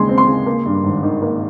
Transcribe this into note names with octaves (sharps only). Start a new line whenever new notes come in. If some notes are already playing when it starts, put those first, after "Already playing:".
Already playing: D#2 C#3 G#3 C6
C4
C6
C#3
A#3
G2
G#1
D#3
A#3